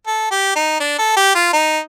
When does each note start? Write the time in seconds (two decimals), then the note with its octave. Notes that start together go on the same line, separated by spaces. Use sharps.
0.07 A4
0.31 G4
0.56 D#4
0.80 D4
0.99 A4
1.17 G4
1.35 F4
1.53 D#4